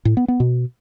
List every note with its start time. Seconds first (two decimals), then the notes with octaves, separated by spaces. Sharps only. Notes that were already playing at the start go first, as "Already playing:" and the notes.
0.05 A2
0.17 B3
0.28 B3
0.40 B2